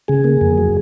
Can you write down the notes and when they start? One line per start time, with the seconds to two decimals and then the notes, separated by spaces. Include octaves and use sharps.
0.08 C#3 G#4
0.24 A#3
0.41 F2
0.58 F#3